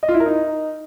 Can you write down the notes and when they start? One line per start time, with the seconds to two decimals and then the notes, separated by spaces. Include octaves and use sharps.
0.03 D#5
0.09 F4
0.14 E4
0.20 A#4
0.26 D#4